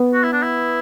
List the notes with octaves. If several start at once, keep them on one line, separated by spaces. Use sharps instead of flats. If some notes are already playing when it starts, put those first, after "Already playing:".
Already playing: B3
F#4
E4
D4
E4